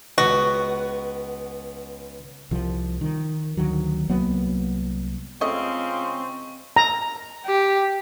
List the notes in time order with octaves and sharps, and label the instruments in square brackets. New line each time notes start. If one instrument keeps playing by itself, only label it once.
[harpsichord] C#2 B3 [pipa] F#4
[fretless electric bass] C2 F3
D#3
D2 D#3 F#3
C2 F#3 A#3 B3
[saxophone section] C#3 G#3 F4 [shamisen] A3 C#4 D#5 [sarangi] C4 [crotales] C#6
[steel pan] A#5
[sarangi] G4